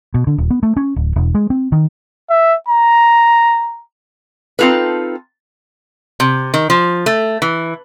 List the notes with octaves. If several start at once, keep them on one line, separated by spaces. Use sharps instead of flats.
B2
D3
D#1
B3
A3
C#4
D1
E1
G#3
C4
D#3
E5
A#5
C4 D#4 F4 A4 B4
C3
D#3
F3
A3
E3